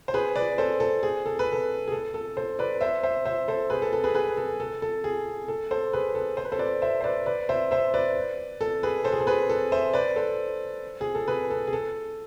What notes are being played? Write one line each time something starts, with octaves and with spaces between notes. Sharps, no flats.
C5
G#4 B4
B4 D5
A4 C5
A4
G#4
A4
B4
A4
G#4
A4
A4
A4 C5
B4 D5
C5 E5
C5 E5
C5 E5
A4 C5
G#4 B4
A4
A4
G#4 B4
G#4 B4
A4
A4
A4
G#4
A4
A4 C5
G#4 B4
A4
C5
B4
A4 C5
B4 D5
C5 E5
C5
B4 D5
B4 D5
C5 E5
C5 E5
B4 D5
A4
G#4 B4
A4 C5
G#4
A4
G#4 B4
A4
C5 E5
B4 D5
A4 C5
G#4
A4
G#4 B4
A4
G#4
A4